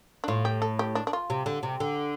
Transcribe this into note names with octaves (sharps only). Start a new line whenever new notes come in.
D4
A2 F4
G4
A4
G4
D4
D4
F4
C3
D3
C3
D3